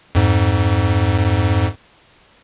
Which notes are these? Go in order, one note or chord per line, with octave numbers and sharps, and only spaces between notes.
F2 G#2